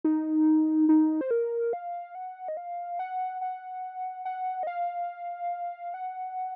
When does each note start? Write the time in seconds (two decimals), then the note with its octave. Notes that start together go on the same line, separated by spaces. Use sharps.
0.04 D#4
0.89 D#4
1.21 C5
1.31 A#4
1.73 F5
2.15 F#5
2.48 D#5
2.57 F5
2.99 F#5
3.41 F#5
4.25 F#5
4.63 D#5
4.67 F5
5.94 F#5